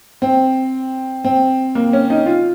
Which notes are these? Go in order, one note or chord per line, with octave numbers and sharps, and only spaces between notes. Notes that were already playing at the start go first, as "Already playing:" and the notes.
C4
C4
A#3
C#4
D#4
F4